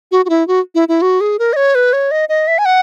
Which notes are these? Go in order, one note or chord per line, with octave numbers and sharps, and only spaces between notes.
F#4
F#4
E4
F#4
E4
E4
F#4
G#4
A#4
D#5
C#5
B4
C#5
D#5
D#5
E5
G#5
F#5